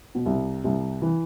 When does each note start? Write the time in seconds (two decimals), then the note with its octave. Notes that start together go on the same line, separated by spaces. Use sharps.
0.15 B2
0.26 C2 C3
0.64 C2 C3
1.02 E3